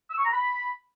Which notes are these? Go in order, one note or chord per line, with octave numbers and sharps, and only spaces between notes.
E6
C#6
A#5
B5